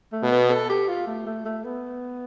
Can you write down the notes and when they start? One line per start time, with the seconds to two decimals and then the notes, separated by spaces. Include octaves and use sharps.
0.12 A3
0.22 B2
0.31 B3
0.50 A4
0.69 G4
0.89 F4
1.07 A3
1.26 A3
1.45 A3
1.64 B3